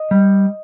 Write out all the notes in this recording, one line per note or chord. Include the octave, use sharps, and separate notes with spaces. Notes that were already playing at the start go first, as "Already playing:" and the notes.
Already playing: D#5
G3